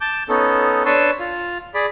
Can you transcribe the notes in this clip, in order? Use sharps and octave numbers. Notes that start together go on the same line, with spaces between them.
A5 D6 G6
B3 C#4 D#4 A4
D4 B4 C#5 A5 C6 E6
F4
G#4 D5 B5